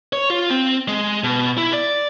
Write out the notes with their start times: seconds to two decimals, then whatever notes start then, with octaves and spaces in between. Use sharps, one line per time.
0.13 C#5
0.30 F4
0.50 C4
0.88 G#3
1.24 B2
1.58 E4
1.73 D5